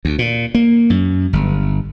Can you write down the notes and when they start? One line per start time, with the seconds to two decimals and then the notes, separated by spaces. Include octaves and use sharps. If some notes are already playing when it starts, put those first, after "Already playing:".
0.05 D2
0.19 A#2
0.55 A#3
0.90 F#2
1.33 G1